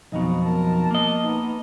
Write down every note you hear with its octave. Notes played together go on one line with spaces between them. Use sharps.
B1 F2 B2 D#4
A#4 A5
A#3 D#5
B3 D#4